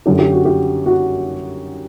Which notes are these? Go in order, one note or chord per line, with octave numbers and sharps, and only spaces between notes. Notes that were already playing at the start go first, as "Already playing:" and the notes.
F#2 D3 G4
G4
F#4
G4
F#4